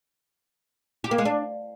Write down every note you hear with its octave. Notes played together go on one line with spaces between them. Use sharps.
G4
A#3
G#3
D4